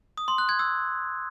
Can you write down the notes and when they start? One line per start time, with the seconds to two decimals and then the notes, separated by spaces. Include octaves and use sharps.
0.18 D#6
0.28 C6
0.38 F#6
0.49 G#6
0.59 E6